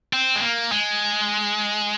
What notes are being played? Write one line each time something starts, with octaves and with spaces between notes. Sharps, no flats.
C4
G#3
A#3
G#3